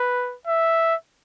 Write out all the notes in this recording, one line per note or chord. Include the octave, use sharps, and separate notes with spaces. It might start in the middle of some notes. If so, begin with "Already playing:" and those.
Already playing: B4
E5